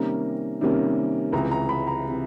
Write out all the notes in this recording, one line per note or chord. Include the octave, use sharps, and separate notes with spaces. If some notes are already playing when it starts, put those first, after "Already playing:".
Already playing: C3 D#3 G3 A#3 C#4 A#5
C3 D#3 G3 A#3 C#4
C#2 C3 E3 A#5
A#5
B5
A#5
C3 E3